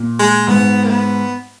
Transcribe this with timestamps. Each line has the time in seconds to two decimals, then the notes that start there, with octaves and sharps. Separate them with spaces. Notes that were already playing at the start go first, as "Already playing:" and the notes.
Already playing: A#2
0.19 G#3
0.48 G#2 B3
0.84 A#3
0.90 B3